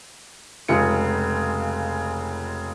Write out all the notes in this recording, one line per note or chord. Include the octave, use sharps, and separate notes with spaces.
F1 C#3 G#3 F4 C#7